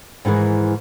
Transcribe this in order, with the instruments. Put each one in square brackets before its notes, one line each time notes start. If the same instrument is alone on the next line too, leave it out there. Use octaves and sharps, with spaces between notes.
[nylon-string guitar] G#2 D#3 E3 G#3